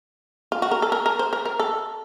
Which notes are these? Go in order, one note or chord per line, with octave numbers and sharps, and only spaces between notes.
F4
F#4
A#4
A4
A#4
A#4
C5
A#4
A#4
A4